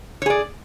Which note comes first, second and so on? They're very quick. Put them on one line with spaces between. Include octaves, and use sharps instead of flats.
C#5 G#4 D5